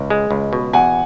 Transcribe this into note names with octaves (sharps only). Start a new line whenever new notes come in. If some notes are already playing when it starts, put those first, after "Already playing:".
Already playing: C#2
G#3
C#2
B2
E2 F#5 G#5